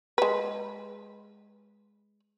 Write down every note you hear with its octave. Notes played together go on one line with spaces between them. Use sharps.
G#3 B4